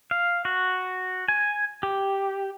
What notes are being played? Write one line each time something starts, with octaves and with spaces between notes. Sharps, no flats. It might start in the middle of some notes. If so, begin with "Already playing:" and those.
F5
F#4
G#5
G4